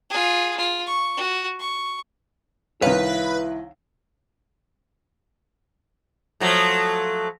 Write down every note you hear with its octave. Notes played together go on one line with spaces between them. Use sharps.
F4 G#4
F4
C#6
F#4
C#6
C2 D#3 E4 B4 C#5 F5
F3 F#3 A3